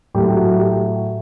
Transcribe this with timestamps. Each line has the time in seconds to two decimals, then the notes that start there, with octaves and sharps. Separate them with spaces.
0.14 A2 F#3 A3 G4
0.36 F#4
0.57 G4